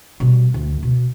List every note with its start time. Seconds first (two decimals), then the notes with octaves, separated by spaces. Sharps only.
0.20 B2 G3
0.54 D2
0.83 B2